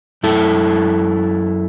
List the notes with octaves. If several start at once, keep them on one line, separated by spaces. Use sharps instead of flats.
F#2 E4 A4